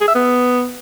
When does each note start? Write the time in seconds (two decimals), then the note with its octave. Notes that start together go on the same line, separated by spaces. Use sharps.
0.01 G#4
0.08 E5
0.15 B3